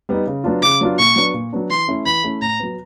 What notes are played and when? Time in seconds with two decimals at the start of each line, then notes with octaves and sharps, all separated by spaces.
0.09 G3 B3 D#4
0.27 C#3
0.44 F#3 B3 D4 F4
0.63 C#3 D6
0.81 F#3 B3 D4 F4
0.99 A#2 C#6
1.16 F#3 B3 D4
1.34 A#2
1.53 F#3 B3 D4
1.70 E3 C6
1.88 A3 C#4 E4
2.06 E3 B5
2.23 A3 C#4 E4
2.41 A2 A#5
2.60 F#3 B3